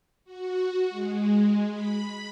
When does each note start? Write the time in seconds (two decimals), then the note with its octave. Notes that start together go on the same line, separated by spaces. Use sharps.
0.25 F#4
0.90 G#3
1.70 B5